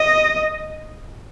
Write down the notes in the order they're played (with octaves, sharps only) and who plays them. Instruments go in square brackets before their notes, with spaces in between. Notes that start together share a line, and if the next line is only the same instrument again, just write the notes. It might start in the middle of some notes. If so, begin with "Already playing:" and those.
Already playing: [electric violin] D#5